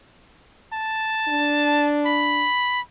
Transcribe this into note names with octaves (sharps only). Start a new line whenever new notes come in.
A5
D4
B5